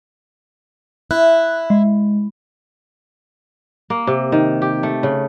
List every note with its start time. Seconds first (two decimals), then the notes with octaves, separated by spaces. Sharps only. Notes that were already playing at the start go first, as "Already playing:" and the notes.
1.11 E4 F#6
1.70 G#3
3.90 A#3
4.07 C3
4.32 D#3
4.62 G4
4.83 A3
5.03 C#3